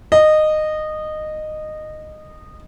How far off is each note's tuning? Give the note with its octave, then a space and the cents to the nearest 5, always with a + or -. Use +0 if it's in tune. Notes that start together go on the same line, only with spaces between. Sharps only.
D#5 -15